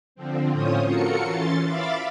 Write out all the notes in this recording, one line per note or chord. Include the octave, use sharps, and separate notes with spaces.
D3 F3 C4
A2 C#4 F4 C5 C#5 D#6
F4 F#4 A4 A#4 C#7
E3 C#4 C6 A6
E5 F5 B5 D6 A6